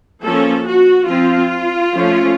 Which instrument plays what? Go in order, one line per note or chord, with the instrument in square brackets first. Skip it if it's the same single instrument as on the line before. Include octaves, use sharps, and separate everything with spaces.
[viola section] F3 A#3 C#4 A4
F#4
F3 C4 F4
F3 A3 C#4